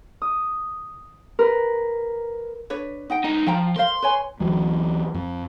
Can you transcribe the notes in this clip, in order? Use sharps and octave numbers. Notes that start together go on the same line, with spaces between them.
D#6
A#4 B4
D4 B4 C#5
D#4 F#5 G5
C#2 D#4 D#5
F3 F5 G5 A#5
A#4 C5 F5 C6
B4 C#5 G#5
D2 E3 F#3
F2